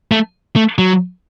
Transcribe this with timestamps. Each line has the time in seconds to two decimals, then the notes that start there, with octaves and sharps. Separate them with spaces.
0.11 A3
0.56 A3
0.78 F#3